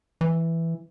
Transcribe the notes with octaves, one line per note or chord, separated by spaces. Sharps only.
E3